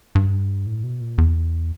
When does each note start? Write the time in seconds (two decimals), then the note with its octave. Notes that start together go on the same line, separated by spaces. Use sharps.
0.15 G2
0.66 A2
0.84 B2
1.01 A#2
1.18 E2